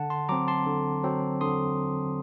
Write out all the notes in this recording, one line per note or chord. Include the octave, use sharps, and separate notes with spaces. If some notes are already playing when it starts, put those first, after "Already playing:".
Already playing: D3 F#5 A5
A5 C6
F#3 C4 A#5 D6
A5 C6
D3
F#3 C4
D3 C6 D#6